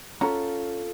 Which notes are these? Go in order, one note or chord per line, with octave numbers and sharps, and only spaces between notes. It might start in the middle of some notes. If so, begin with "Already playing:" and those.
C#4 F4 A4 F#5 A#5